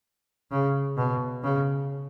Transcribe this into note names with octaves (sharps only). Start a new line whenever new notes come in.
C#3
B2
C#3